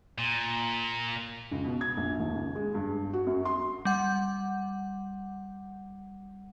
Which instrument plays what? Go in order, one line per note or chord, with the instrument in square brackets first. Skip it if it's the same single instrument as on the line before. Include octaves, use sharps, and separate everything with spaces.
[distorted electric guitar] A#2
[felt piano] C#2
B2
G#6
A#1
D#2
C#2
G#3
G2
F#4
F#2
C6
[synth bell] G3 F#5